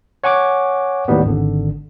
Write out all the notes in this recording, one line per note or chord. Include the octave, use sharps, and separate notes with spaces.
C#5 F#5 G#5 C#6 D6
D#2 A2 G3 B3
G#1 D3